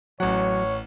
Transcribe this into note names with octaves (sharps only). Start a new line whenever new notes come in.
A1 F#3 C#5 F#5